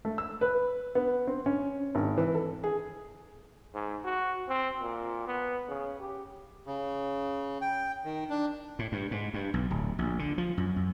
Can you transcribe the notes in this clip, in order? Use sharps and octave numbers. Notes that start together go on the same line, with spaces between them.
A3
E6
B4
B3
C4
C#4
G#1
E3
A4
G#4
G#2
F#4
C4
A#2
B3
C#3
G4
C#3
G5
D#3
D4
A2
G2
G#2
G2
B1
D1
A#1
D3
F3
F#2
F#2